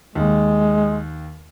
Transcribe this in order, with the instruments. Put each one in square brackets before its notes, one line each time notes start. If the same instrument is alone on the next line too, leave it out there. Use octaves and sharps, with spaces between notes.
[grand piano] D#2 [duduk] G#3